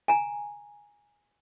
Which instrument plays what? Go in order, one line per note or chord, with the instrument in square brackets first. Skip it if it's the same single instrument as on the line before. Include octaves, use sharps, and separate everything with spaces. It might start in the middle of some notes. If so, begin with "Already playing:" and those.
[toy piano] G#5 A#5